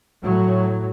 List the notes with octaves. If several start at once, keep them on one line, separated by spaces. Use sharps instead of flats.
A2 F#3